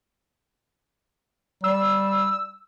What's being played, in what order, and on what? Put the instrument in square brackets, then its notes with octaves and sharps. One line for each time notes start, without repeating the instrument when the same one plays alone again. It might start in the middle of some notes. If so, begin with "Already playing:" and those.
[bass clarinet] G3 [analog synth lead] E6